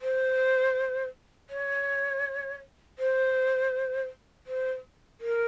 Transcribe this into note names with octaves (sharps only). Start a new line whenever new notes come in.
C5
C#5
C5
C5
A#4